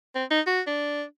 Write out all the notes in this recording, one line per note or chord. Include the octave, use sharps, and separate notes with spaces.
C4
D#4
F#4
D4